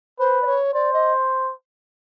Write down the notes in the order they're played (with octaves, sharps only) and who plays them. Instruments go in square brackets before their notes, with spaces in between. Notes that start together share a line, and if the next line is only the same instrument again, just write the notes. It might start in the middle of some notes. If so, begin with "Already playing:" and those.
[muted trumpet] B4 [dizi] C5
[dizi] D5
C#5
[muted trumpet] C5 [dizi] D5
[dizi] D#5